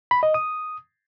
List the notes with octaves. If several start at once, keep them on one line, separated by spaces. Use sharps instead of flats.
B5
D#5
D#6